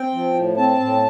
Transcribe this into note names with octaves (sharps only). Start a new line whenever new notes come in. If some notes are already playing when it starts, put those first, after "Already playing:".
Already playing: C4 G5
F3
A2
C4 A5
A2